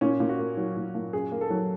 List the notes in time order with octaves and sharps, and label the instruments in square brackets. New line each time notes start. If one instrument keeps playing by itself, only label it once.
[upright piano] A#2 C#4
A#2
F#4
A#3
F#3
A#2
A#2
F#2 G#4
A#3
A4
F#3